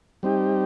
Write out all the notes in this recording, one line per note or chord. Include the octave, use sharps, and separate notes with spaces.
G3 C4 D#4 G4